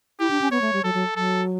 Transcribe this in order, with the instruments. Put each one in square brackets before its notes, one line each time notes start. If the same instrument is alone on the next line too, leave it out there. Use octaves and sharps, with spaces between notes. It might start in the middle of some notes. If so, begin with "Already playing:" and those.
[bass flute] E4 [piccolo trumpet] G4
[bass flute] D4
C#4
[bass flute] B3 [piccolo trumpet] C#5
[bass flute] A3
G3
[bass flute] F#3 [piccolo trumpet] A4
[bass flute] F#3
[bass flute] F#3 [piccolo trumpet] A4